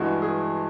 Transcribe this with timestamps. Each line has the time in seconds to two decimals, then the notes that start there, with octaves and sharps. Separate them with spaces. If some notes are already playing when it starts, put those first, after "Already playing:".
Already playing: G2 E3 G#3 F#4
0.22 G#4